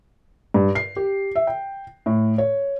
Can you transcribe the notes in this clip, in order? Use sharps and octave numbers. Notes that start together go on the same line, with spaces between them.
G2
C7
G4
E5
G5
A2
C#5